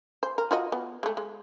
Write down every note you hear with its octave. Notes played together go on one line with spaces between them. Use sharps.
C5
A#4
F4 F#4 D#5
B3
G#3 A3
G#3